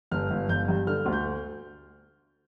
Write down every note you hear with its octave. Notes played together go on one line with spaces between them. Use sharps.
G1 F6
G1
G1 G6
G2
D3 F6
D2
G6